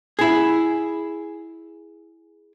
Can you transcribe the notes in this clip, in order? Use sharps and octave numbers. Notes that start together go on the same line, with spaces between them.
E4 G#4